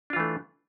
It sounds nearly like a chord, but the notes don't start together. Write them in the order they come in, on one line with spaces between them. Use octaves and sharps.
D4 F4 E3 A3